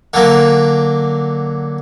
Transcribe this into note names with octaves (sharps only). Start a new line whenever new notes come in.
D3 F#3 A#3